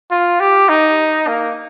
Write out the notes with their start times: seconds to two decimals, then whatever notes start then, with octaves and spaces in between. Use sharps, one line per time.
0.11 F4
0.40 G4
0.69 D#4
1.27 A#3